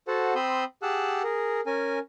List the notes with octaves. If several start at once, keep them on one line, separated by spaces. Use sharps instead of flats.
F#4 A4 C5 F#5 A5
C4 B5 C6 D#6 E6 G6
G4 G#4 F#5 A5 E6 F#6
G#4 A#4
C#4 A#4 G#5